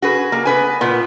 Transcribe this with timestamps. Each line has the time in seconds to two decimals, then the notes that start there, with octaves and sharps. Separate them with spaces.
0.02 F#4 G#4 B4
0.32 A#3
0.45 B3 B4 G#5
0.81 A#2 B3